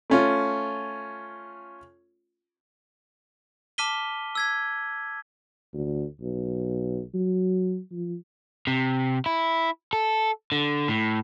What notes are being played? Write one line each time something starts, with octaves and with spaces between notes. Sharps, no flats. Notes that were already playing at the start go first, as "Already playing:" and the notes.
A3 C#4 F4
A5 D6 F6 B6 D#7 G7
E6 G#6 B6
D2
B1
F#3
F3
C3
E4
A4
D3
A2